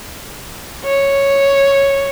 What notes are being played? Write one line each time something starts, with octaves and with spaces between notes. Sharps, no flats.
C#5